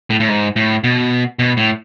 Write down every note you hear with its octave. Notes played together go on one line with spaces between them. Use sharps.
A2
A2
G#2
A2
B2
B2
A2